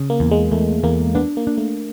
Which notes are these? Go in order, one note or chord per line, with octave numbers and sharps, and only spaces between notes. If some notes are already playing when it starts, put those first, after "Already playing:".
Already playing: C#3
A#3
E2
G#3
E2 A3
E2 A#3
B3 D4
A#3
D4
A3